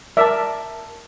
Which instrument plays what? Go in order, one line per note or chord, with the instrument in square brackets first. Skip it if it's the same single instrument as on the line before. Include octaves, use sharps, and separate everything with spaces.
[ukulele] A#4 A5 [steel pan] D5 E5